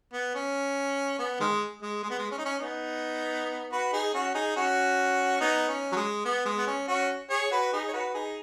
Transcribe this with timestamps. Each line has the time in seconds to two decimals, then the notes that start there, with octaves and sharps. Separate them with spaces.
0.13 B3
0.35 C#4
1.19 B3
1.40 D#3 G#3
1.82 G#3
2.03 G#3
2.11 B3
2.18 G#3
2.31 C#4
2.38 D#4
2.45 C#4
2.59 B3 D#4
3.72 F#4 B4
3.92 D#4 G#4
4.13 C#4 F#4
4.34 D#4 G#4
4.56 C#4 F#4
5.41 B3 D#4
5.68 C#4
5.92 F#3
5.96 G#3
6.25 B3
6.45 G#3
6.58 B3
6.67 C#4
6.88 C#4 F#4
7.30 G#4 C#5
7.51 F#4 B4
7.72 D#4 G#4
7.88 C#5
7.93 F#4 B4
8.14 D#4 G#4